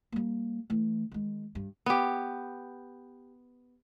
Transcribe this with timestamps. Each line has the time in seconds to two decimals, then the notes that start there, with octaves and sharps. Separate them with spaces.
0.12 G3 A#3
0.70 E3 A3
1.12 D#3 G#3
1.55 G2
1.86 B3 G4